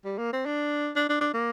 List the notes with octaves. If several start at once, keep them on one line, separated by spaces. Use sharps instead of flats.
G3
A#3
C4
D4
D4
D4
D4
A#3